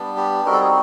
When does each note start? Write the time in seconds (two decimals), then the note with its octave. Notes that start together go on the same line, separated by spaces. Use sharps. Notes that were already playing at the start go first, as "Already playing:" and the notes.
Already playing: G3 B3 D4
0.17 G4
0.45 G3 C4 D#4 F#4 A#4
0.53 A4
0.60 G#4